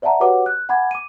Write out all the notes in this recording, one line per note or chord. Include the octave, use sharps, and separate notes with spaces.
C5 D5 E5 F#5 A5 A#5
F#4 G4 B4 C#5 F#5 D6
F#6
F#5 G#5 B5 D6 G#6
D6 D#7